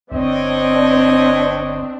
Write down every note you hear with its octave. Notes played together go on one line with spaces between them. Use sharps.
G1 C4 D4 C#5 D#5